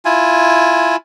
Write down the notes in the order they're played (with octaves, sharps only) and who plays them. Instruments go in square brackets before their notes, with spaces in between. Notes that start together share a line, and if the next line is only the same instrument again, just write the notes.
[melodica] E4 F4 G#5